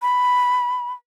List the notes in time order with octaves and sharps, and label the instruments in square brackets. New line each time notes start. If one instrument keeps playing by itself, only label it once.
[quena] B5